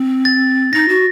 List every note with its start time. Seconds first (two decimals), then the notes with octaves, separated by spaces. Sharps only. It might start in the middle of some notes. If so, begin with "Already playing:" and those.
Already playing: C4
0.25 A6
0.73 D#4 A#6
0.89 F#4